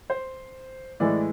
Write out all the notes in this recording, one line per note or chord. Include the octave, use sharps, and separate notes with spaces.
C5
A2 E3 G#3 D5